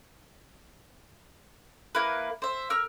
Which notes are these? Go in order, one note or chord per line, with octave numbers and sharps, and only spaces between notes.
A#3 E4 A#4 B4
C5 E5
A#4 E6 F6